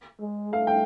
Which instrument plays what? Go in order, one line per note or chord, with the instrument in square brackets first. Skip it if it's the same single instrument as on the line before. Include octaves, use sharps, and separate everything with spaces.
[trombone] G#3
[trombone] A3 [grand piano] F5
[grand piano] G5